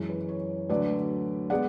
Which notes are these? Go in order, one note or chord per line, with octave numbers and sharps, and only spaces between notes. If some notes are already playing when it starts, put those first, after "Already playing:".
Already playing: F#2 E3 G#3
B4
C#5
D2 D3 F#3 B4 D5
G#3 B3 D5 F#5